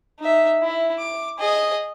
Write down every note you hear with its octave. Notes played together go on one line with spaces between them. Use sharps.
D#4 E5
E4
D6
G#4 D#5